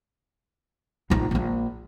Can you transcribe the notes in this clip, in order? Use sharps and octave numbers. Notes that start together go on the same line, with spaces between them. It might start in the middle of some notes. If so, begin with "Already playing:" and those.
A#1 D#4
A#1 A#3